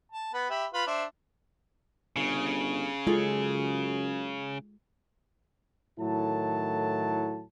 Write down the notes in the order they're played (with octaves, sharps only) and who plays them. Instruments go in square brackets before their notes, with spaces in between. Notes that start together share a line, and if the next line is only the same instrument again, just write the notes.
[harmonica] A5
B3 B4
G4 E5 B5
F4 B4 B5
D4 C5 E5
[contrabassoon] G1 [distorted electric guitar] C#3
[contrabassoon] F#2 [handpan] G#3 [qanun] F4 G#4 A4
[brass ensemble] A2 D#3 F#3 E4 A4 A5